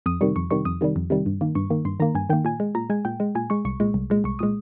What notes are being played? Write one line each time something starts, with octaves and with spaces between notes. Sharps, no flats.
F2 D#6
C3 D#3 G3 C#6
F2 C#6
C3 D#3 G3 C#6
F2 D#6
C3 D#3 G3
F2
C3 D#3 G3
G2
D#3 A#3
G2 C#6
D#3 A#3
G2 C6
D#3 A#3 A#5
G2 G#5
D#3 A#3 G5
A#2 G#5
G#3
A#2 A#5
G#3 G#5
A#2 G5
G#3
A#2 G#5
G#3 C#6
C2 C#6
A#2 G#3
C2
A#2 G#3
C2 C#6
A#2 G#3 D#6